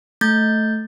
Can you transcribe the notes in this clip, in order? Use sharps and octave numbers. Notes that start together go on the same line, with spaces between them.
A3 G6 A6